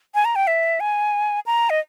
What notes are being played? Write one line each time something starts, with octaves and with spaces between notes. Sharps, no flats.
G#5
A#5
G5
E5
G#5
A#5
D#5